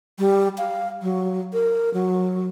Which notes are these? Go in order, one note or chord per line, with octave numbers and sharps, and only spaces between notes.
G3
F5
F#3
A#4
F#3